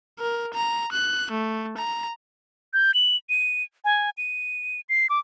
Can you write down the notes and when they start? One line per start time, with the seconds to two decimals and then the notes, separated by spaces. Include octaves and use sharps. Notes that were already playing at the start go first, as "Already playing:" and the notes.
0.19 A#4
0.54 A#5
0.92 F#6
1.31 A3
1.77 A#5
2.74 G6
2.94 F#7
3.29 D#7
3.85 G#5
4.18 D#7
4.89 C7
5.10 D6